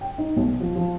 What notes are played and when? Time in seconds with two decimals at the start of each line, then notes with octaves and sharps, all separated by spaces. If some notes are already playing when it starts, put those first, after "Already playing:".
0.01 G5
0.18 D#4
0.36 B1
0.60 F3
0.75 F3